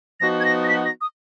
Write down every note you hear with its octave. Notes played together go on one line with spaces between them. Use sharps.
F3 B3 D#4 F#4 A#6
G#6
A#6
A#6
B6
A#6
D#6